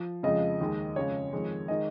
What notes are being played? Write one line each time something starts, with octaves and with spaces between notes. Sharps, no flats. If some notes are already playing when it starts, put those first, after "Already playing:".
Already playing: F3
F2 C#3 F3 G#3 D#5
D#2 D#3 G#3
F2 C#3 G#3 C#5
F2 D#3 G#3
D#3 G#3 D#5